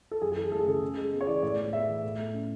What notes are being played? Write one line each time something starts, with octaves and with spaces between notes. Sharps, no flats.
A4
F#2 G#4
G#4
E3 A4
A3 A4
G#4
C#3 A4
C#3
G#3
B3
C#5
E3 D5
A2 D5
G#3
B3 E5
E3
A2
A3
C#4